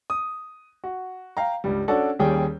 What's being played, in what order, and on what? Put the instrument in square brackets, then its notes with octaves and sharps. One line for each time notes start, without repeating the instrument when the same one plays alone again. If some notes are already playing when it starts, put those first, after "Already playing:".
[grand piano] D#6
F#4
F5 G5 A#5
C#2 G2 G3
C#4 D4 F#4 A4 D5
D#2 G3 C#4 G#4 G5